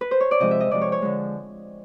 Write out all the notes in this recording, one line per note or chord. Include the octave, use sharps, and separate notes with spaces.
B4
C5
C#5
D5
C3 F3 G#3 D#5
E5
D#5
C3 F3 G#3 D5
C#5
C#5
D3 F3 G#3